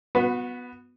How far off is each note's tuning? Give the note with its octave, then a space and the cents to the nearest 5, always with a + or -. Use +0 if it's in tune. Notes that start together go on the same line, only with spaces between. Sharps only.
B3 +0 F#4 -30 B4 +10